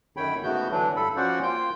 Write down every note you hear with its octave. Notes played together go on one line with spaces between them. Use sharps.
F#2 D3 D#3 C#5 G5 B5
G#2 C#3 A3 B3 F#4 G6
D3 E3 F#3 D4
G2 A4 B5
F3 C#4 F#4 C5 D5 F#5
A#3 F4 C5 G5 G6